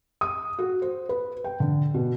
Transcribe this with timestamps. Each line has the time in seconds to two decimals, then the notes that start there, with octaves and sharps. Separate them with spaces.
0.21 D#6
0.58 F#4
0.82 C5
1.09 B4
1.44 G5
1.60 D3
1.94 B2